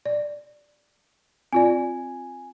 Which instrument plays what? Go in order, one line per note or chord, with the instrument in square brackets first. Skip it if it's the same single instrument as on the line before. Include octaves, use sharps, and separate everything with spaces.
[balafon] D5
[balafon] C4 F4 D5 [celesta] G#5